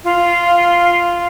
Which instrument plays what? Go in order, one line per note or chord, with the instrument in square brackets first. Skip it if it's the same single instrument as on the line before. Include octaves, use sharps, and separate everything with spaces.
[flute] F4